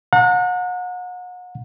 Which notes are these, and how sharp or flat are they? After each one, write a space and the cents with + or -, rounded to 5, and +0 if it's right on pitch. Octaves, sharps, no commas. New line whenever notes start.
F#5 -35 A#5 -40